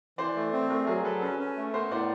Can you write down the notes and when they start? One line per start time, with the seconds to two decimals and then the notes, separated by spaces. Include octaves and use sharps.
0.18 E3 C5 D5
0.36 A3
0.53 C4
0.70 A3 G#4 A#4
0.87 F#3 G#4 A#4
1.05 F#3 A4 B4
1.22 C#4 A4 B4
1.39 C#4
1.57 A3
1.74 B3 A#4 C5
1.91 A2 C5 D5